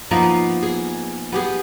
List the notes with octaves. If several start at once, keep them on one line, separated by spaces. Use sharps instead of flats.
F3 A#3 B3 D#4
G#4
B3 G4 G#4